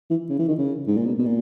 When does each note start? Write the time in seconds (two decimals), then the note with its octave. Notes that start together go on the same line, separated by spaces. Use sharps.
0.10 E3
0.30 C#3
0.39 E3
0.49 D#3
0.58 C#3
0.87 G#2
0.97 A#2
1.06 B2
1.19 B2
1.26 A#2